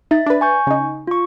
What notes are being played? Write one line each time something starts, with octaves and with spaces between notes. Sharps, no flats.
D#4 E5 A6
D4 B4
G#5 C#6 G6
C#3 D#4
F4 C#6